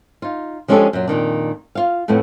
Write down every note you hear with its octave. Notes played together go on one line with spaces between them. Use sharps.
D#4 F4
F3 G#3 C#4 D4 G4 A4
F#2 A#2 F#3
F2 A#2 D#3 D4
F4 F5
F2 A2 A3 B3 E4